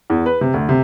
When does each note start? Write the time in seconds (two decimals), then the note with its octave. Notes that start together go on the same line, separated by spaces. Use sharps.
0.10 E2
0.26 B4
0.41 C3
0.54 D2
0.69 C3